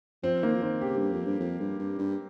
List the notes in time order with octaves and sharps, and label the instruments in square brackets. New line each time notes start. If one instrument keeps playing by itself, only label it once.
[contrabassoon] F3 [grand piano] C4
[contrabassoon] D#3 [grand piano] A#3
[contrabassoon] F3
[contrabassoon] D#3 [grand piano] C4
[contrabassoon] C#3 [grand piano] G4
[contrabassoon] G2
F2
G2
F2
G2
G2
G2